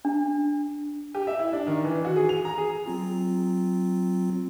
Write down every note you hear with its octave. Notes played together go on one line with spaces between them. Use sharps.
D4
G4
E5
E4
D4
D#3
E3
F#4
G#4
F7
A#5
G#4
F#3 C4 F4